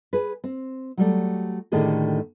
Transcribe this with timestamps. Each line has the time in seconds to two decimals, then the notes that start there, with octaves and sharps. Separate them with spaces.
0.13 G#4 B4
0.44 C4
0.97 F#3 G3 A3
1.72 A2 D3 D#3 A#3 G4 G#4